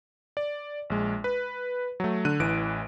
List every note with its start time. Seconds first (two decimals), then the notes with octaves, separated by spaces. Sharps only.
0.37 D5
0.90 A#1 G#3
1.24 B4
2.00 F#3 A3
2.25 D3 F#6 D#7
2.39 A1 E3 D7